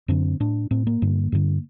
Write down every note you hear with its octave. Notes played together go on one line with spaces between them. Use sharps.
F#2 D3 C4
A2 D4
A2 C4
A#3
G2 D3
G2 D3